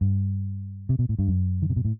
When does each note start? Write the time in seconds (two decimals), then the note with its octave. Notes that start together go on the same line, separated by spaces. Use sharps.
0.01 G2
0.89 C3
0.99 B2
1.09 A2
1.19 G2
1.28 F#2
1.62 D#3
1.70 C3
1.76 B2
1.85 A2